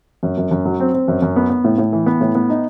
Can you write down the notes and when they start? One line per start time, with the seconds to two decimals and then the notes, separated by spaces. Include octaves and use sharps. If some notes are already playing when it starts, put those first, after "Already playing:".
0.23 F#2
0.38 F#2
0.51 F#2
0.65 F#3
0.80 C4
0.94 C4
1.08 F#2
1.22 F#2
1.36 B3
1.50 B3
1.64 A2
1.78 A2
1.93 E3
2.06 B3
2.21 A2
2.35 B3
2.50 D#4